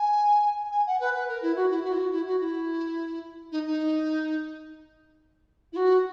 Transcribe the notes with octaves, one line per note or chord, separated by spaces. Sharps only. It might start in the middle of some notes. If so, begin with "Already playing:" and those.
Already playing: G#5
G#5
F#5
B4
B4
A#4
E4
F#4
E4
F#4
E4
F#4
E4
F#4
E4
D#4
D#4
E4
F#4